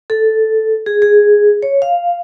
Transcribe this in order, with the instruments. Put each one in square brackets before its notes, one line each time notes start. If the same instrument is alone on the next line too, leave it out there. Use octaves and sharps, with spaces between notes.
[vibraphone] A4
G#4
G#4
C#5
F5